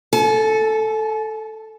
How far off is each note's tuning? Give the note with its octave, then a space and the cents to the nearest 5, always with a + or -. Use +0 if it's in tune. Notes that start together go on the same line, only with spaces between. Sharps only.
A4 +0 G#5 +45